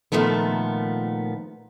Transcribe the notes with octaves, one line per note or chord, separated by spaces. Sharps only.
A#2 D#3 F3 A3 B3